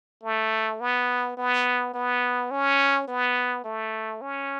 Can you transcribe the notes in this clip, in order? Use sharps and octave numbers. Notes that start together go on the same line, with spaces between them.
A3
B3
B3
B3
C#4
B3
A3
C#4